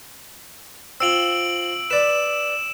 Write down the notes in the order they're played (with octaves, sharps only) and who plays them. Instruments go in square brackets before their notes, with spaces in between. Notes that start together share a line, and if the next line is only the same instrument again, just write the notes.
[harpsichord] C4 F4 [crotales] E6 D7 F#7
[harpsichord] B4 D5 [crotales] E7